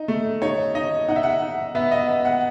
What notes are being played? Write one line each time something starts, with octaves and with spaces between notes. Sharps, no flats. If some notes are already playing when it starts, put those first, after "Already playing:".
Already playing: D#4
A3
D#4 C#5
D#4 D#5
D#4 F#5
E5
F#5
D#4
B3 E5
D#5
B3 E5
F#5